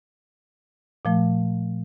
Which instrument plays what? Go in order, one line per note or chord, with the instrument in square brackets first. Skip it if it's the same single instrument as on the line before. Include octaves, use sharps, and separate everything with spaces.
[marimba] A#2 F3 A3